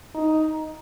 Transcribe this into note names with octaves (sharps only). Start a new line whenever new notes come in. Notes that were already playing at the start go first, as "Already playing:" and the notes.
D#4